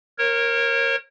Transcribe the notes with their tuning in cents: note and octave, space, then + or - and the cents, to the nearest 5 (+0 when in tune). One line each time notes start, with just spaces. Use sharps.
A#4 +0 C#5 -30